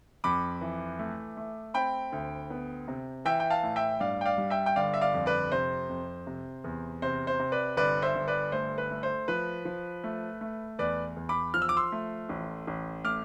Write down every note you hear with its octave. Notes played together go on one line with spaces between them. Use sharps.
F2 B5 D6
E3
A3
A3
C4 G5 B5
D2
B3
C3
E3 E5 G5
G5
F5 A5
A2
E5 G5
G2 D5 F5
G5
D5 F5
G3
E5 G5
G5
G1 D5 F5
E5
D5 F5
F2
B4 D5
C3 C5
F2
C3
E2
C3 C5
C5
C3
B4 D5
G1 B4 D5
C5 E5
G1
B4 D5
A3 C5
B4
A3
C5
F3 B4
F3
A3
A3
E2 B4 D5
E2
B5 D6
F3 F6
E6
D6
C6 E6
A3
A1
A1
A3 D6 F6